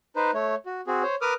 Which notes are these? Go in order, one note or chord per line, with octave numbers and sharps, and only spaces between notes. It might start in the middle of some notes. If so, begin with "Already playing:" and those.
D#4 B4 C5
A3 C#5
F#4
C4 F#4 G#4
C5 C#5
A#4 B4 D6 D#6 F6